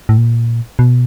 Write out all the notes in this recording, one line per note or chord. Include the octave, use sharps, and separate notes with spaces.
A2
A#2
B2